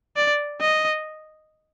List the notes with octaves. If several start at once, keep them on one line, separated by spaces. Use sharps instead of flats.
D5
D#5